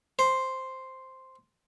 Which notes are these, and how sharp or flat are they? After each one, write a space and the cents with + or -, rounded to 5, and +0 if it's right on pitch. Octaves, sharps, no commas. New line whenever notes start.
C5 +0